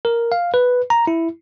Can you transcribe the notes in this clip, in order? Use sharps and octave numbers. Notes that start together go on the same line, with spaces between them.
A#4
F5
B4
A#5
E4